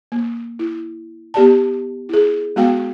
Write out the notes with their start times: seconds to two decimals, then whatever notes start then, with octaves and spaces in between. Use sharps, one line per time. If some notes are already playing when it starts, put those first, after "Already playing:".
0.12 A#3
0.59 E4
1.34 B3 G4 D5 A5
2.09 E4 G#4
2.56 G#3 B3 F#4 F5 G5